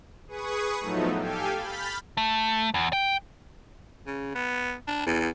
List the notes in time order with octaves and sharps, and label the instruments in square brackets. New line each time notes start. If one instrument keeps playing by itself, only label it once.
[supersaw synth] G#4 B4 C#6 D#6
A2 F3 F#3 A3 B3 D#4
G4 A4 F5 G5 G#5
B5 F6 G6 A6 B6
[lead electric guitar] A3
E2
G5
[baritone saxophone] C#3
B3
D4
E2